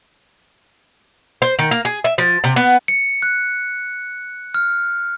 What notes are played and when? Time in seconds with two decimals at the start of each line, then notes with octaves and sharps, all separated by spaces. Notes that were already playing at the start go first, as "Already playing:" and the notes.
1.42 C5
1.59 D#3
1.71 A#3
1.85 G#4
2.04 E5
2.18 F3
2.44 C3
2.56 B3
2.88 C#7
3.22 F#6
4.54 F6